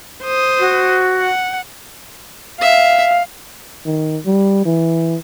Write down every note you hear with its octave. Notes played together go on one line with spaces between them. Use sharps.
C5 D#6
F#4
F#5
E5 F5
D#3
G3
E3